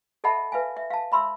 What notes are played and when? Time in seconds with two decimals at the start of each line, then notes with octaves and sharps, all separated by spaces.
0.24 A4 D#5 E5 F#5 A5 B5
0.52 B4 E5 F5 G#5
0.77 E5
0.90 F5 A5
1.12 E5 B5 C6 E6